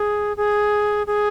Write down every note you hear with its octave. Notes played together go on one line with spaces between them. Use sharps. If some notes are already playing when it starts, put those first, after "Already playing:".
Already playing: G#4
G#4
G#4